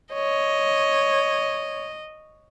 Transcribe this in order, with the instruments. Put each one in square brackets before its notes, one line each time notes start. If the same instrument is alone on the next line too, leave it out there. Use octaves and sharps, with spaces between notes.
[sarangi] C#5 [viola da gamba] D#5